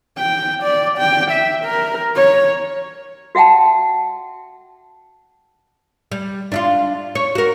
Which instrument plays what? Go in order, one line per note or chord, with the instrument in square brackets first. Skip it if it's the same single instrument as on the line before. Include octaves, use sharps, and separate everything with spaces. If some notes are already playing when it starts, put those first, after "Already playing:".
[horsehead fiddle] G5
D5
G5
E5
A#4
C#5
[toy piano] F#4 E5 F#5 G5 A5
[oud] G3
D4 E4 F4
C#5
F#4 A#4